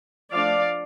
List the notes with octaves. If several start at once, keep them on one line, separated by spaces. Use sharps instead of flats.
F3 A3 D4 D5 F5